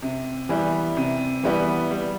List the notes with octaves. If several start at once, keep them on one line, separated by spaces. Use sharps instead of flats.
C3
E3 G3 B3
C3
E3 G3 B3
G3